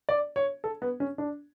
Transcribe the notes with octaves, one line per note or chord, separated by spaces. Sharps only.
D5
C#5
A4
B3
C#4
D4